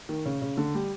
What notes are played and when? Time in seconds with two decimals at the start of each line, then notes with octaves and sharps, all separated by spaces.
0.09 D#3
0.25 C#3
0.42 C#3
0.57 D3
0.74 G3